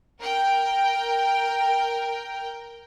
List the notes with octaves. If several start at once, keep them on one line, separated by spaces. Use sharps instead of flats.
A#4 G5